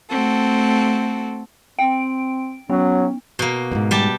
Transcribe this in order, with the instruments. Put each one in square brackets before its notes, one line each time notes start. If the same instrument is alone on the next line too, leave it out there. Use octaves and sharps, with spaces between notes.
[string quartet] A3 C4 F#4 A4
[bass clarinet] C4 [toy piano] G5 [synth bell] D7
[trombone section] F#3 [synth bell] B3 [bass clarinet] C#4 [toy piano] B5
[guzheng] B2 A#3
[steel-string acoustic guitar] E2 G#2
[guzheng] G3 G4 A5